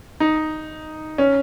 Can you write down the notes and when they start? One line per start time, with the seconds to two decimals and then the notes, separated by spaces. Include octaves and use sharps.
0.20 D#4
1.18 C#4